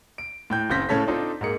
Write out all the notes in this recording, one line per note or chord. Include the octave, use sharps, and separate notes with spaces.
D7
A2 G5 G6
F#1 C#3 C4 G6 A#6 B6
A2 C#3 C#4 A4 C#5 B6
C4 D4 D#4 F4 A4
G#2 A#3 G#4 C#7